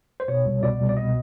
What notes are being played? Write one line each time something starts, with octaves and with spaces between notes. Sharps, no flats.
C5
B2 C#5
C2
B2 D5
C2
D5
B2 D#5